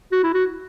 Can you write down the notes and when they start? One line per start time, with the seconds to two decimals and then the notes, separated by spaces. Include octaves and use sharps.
0.12 F#4
0.23 E4
0.34 F#4